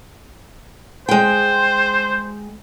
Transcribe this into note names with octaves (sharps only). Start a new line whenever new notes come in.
G#3 C5 G5